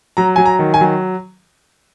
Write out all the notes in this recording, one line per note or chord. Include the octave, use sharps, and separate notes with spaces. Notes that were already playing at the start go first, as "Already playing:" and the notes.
F#3 A#5
F#3 G#5
A#5
D#3
G#5
F#3